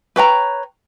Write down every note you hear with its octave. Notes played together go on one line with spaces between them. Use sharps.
B4 C#5 G5 A#5